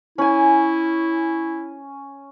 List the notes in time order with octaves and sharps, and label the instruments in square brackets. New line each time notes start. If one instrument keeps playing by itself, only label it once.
[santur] C#4 G#5 [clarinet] E4